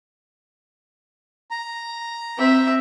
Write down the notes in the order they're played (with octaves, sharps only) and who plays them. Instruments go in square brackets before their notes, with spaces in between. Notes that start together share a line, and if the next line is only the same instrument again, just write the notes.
[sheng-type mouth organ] A#5
[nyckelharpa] C4 E5